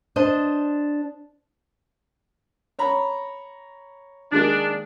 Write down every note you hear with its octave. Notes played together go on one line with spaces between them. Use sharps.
D4 C5 D#5
C#5 A#5 B5
D#3 G#3 A#3 D4